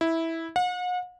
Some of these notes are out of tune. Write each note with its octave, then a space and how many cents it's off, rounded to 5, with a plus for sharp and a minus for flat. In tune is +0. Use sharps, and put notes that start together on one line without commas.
E4 -10
F#5 -40